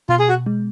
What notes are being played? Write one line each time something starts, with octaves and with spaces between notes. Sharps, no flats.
B2 F4
G#4
F#4
G#3